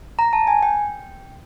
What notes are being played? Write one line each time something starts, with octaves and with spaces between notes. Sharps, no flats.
A#5
A5
G#5
G5